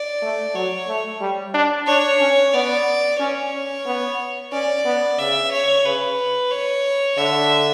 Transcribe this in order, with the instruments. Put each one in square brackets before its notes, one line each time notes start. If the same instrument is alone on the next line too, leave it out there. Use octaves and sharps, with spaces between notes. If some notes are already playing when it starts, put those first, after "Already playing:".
Already playing: [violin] D5
[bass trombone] A3
[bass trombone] F#3 [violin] C#5
[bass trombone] A3
G3
D4
[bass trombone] D4 [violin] C#5
[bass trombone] C#4
[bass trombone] B3 [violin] D5
[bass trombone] C#4 [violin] C#5
[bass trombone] B3
[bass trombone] C#4 [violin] D5
[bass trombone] B3
[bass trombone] C#3 [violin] E5
[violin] C#5
[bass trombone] C#3 [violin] B4
[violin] C#5
[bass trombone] D3 [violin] E5